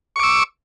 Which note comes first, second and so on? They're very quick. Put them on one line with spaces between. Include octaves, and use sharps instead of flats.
C#6 D6 E6